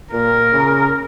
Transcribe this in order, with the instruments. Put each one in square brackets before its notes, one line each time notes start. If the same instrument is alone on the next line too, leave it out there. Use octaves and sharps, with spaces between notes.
[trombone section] A#2 [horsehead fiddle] A#4
[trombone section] C#3